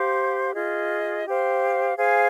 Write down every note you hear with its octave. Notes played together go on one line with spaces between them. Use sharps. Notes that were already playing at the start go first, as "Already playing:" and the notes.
Already playing: G4 C5 F5
F4 G#4 D#5
G4 C5 F5
G#4 C5 F5 G#5